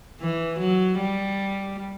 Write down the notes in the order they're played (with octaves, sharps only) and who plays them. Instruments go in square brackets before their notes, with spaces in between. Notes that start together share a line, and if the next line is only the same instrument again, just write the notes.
[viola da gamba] E3
F#3
G3